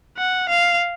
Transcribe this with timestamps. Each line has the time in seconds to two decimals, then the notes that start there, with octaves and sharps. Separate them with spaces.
0.17 F#5
0.49 F5